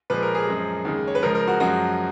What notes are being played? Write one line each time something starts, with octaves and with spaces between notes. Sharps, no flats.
A#2 F3 G#3 B4
A#4
G#4
F#2 F3 G#3
D#2 C#3 G#3
C#5
B4
C#2 C#3 F3 G#3 A#4
A#4
F#4
F#2 F3 G#3 F#4